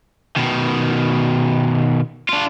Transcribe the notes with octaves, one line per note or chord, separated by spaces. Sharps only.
B2 D#3
D4 F4